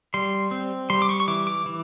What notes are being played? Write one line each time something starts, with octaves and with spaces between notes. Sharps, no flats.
G3 C6
C4
G3 C6
D6
C#6
C#6
E3 D6
D6
E3